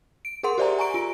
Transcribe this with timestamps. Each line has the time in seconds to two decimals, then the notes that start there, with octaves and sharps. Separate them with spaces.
0.25 D7
0.43 G#4 A#4 F#5 C6
0.58 G4 C5 D5 E5 G#5 A#5
0.78 G#5 A#5 C#6 D7
0.94 F4 D7